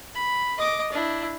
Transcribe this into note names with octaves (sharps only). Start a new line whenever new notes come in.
B5
D#5 D6
D4 E4